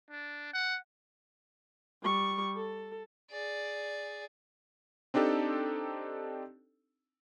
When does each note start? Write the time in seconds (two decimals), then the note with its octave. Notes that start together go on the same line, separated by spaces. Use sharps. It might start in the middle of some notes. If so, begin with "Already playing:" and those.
0.11 D4
0.54 F#5
2.03 G3 C#6
2.57 A4
3.31 G#4 D5
5.14 C4 D4 D#4 G4 A4